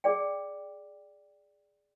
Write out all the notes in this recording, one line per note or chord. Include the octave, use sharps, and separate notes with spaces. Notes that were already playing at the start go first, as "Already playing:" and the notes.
G#4 D5 G5